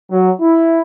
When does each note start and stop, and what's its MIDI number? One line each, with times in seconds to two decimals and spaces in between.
0.11 0.30 54
0.41 0.81 64